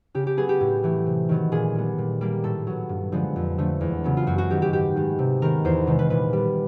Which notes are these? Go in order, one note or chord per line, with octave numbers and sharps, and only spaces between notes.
C#3 G4
G4
F#3 B3 G#4
G4
A2
E3 A3
C3
D#3 F#3 B3
A#2 G#4
G3 B3
A#2
G3 A#3
A2 A4
F#3 B3
G2
D3 F3 G#3 B3
F2
D3 F3 A3
E2
C#3 F#3 B3
F4
F#2 F#4
F#4
D#3 F#3 B3 G4
G4
G#2 G4
D#3 G#3 B3
C3
D#3 G#3 B3 A#4
E2 C5
C3 D#3 G#3 B3
B4
A#2 B4
G3 B3